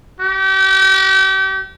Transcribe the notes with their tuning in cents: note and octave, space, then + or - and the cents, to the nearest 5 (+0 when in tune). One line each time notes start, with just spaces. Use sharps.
G4 -35